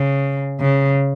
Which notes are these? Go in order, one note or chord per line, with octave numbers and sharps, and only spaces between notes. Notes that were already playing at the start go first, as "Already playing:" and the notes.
Already playing: C#3
C#3